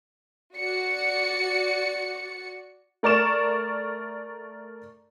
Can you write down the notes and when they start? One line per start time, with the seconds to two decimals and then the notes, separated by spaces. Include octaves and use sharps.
0.55 F#4 D5 C#7
3.03 A3 A#4 D5 C#6 E7